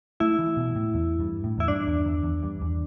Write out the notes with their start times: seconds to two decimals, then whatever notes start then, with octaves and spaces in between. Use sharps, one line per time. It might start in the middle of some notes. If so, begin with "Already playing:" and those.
0.20 A3 E4
0.39 E3
0.57 B2
0.76 A2
0.94 E2
1.20 G2
1.44 A2
1.58 E2 E4
1.68 G2 D4
1.87 E2
2.05 E2
2.23 E2
2.43 G2
2.61 E2